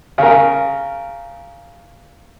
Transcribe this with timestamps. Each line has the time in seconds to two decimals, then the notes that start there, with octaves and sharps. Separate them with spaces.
0.18 C#3 A#4